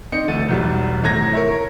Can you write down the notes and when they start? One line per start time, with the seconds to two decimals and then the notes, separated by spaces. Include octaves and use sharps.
0.12 C4 D#4 D5 D#5 C#7
0.28 D2 E3 A3 E4 A6 D#7
0.49 E1 B1 G3
1.03 G#1 A2 A3 A#5 G#6 A#6
1.33 A#4 C#5 E5